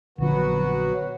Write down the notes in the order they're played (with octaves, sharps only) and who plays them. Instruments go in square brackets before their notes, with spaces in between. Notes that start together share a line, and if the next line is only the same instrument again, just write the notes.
[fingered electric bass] A#1 D3 F3 [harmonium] F#3 B3 F#4